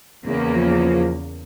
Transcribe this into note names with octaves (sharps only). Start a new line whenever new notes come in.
E2 C#3 A#3
F3